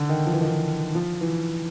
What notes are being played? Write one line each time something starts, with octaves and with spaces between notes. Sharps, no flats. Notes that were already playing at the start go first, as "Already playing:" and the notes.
Already playing: D3
D#3
F3
E3
D#3
E3
F3
E3